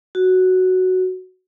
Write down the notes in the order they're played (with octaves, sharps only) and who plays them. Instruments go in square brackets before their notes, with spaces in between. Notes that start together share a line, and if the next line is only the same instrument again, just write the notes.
[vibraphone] F#4